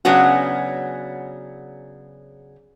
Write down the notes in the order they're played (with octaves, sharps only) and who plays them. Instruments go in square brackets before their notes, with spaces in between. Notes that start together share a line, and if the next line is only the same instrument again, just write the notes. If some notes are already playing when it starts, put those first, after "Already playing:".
[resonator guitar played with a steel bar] C#3 F#3 B3 C#4 D4 F#4